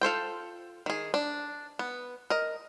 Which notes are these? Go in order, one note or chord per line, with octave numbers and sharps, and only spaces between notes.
F4 A4 C5 G5
D#3 G#4
D4
B3
A#4 D#5